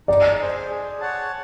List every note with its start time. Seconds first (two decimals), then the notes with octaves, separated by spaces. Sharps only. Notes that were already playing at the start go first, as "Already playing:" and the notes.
0.08 D#4 D5
0.39 G#4 C5
0.70 G#4
1.01 C#5 F#5 A5